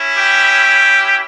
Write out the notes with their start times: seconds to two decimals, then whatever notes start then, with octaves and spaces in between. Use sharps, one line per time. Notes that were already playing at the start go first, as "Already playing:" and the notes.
Already playing: C#4 E4
0.16 G4